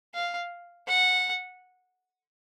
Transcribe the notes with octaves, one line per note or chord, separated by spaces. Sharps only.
F5
F#5